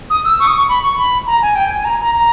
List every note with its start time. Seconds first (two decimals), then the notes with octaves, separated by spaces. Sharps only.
0.10 D#6
0.25 E6
0.39 C#6
0.47 D#6
0.55 C#6
0.69 B5
0.83 C#6
0.98 B5
1.26 A#5
1.42 G#5
1.55 G5
1.65 G#5
1.76 G#5
1.85 A#5
2.00 A#5
2.14 A#5